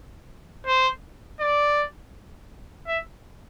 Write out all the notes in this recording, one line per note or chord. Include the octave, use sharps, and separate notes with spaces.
C5
D5
E5